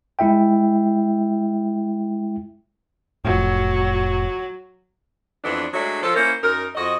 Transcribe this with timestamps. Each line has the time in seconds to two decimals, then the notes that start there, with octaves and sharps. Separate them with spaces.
0.19 G#3 E4 E5 G5
3.24 F1 A2 F#3
5.44 F2 E3 B3 D4
5.74 F#3 G#3 A3 D4
6.03 F3 A4
6.15 A#3 C#4 E4 A#4 C5
6.42 F#2 D#4 A#4
6.75 F2 F#4 D#5